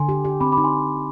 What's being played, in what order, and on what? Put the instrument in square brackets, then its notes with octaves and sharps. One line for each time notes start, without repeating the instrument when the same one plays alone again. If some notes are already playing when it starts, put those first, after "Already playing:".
Already playing: [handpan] D3 [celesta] G#5 C6
[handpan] G4
G4
[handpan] C4 [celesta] B5 D6
[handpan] D#4 [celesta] B5 D6
[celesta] G#5 C6